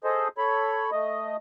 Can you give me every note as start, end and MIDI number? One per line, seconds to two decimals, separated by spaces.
0.04 0.28 68
0.04 0.28 69
0.04 0.28 72
0.04 0.28 75
0.38 0.90 69
0.38 0.90 73
0.38 0.90 83
0.92 1.36 57
0.92 1.36 75